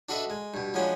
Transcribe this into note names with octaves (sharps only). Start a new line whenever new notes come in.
D4 F#4 A4 B4 D#5 E5
G#3
G2 B2
F3 F#3 G#3 B3 C#4 D4